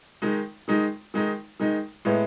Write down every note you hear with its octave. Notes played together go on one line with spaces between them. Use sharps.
D#3 G#3 D#4
D#3 G#3 D#4
D#3 G#3 D#4
D#3 G#3 D#4
A2 G#3 B3 E4